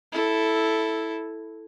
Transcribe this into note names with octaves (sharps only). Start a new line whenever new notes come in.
E4 A4